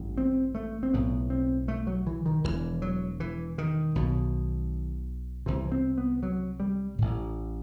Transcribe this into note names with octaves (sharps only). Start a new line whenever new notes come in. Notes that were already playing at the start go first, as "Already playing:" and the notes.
Already playing: A1 G2
C4
A3
C4
B1 A2 B3
C4
A3
F#3
E3
D#3
E1 D#2 E3
F#3
E3
D#3
B1 B2
C2 C3 E3
C4
B3
F#3
G3
A1 A2